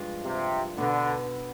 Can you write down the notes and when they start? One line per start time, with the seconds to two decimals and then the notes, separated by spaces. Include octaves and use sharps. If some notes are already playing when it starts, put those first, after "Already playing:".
Already playing: G2 F3 G#3 D4 F4
0.24 C3
0.77 B2 D3 B3 D4